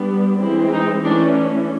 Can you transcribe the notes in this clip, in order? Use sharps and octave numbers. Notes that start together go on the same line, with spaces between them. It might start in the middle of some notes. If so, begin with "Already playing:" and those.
Already playing: G3 B3 D4
E3 G#3 C4 E4
D#4
E3 A3 C#4 D4